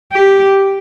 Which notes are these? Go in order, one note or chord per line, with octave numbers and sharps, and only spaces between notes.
G4